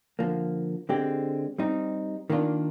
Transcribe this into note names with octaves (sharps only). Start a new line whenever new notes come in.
D3 F3 A#3
D3 G#3 C4 G4
G3 C4 D#4
D#3 A#3 D4 F4